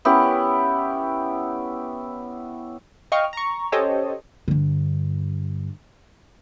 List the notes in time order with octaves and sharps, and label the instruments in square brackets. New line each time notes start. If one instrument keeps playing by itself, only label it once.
[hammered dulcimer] B3 C#4 E4 G4
[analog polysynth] D#5 F5 G5 C#6 F6
A#5 C#6
C#4 G4 A4 C5 C#5 D#5
[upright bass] G2 D3